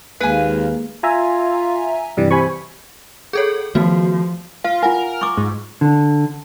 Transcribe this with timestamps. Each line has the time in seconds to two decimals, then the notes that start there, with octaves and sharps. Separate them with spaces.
0.21 D#2 G#3 A#3 G#4 B4 F5 G#5
1.03 F4 E5 G#5 A#5
2.17 G2 C3 E3 G3
2.31 C3 G#5 B5 C#6
3.33 G#4 A4 C#5
3.75 D#3 F3 A3 B3 F#4
4.64 F4 F5
4.83 F4 A#4 F#5 G#5
5.21 C#6 D6
5.37 G#2
5.81 D3